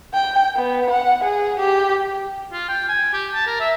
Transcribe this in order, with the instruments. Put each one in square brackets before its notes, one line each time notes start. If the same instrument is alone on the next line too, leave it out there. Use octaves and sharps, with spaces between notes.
[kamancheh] G5
B3
F#5
G#4
G4
[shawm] F4
G5
G#5
G4
A5
A#4
E5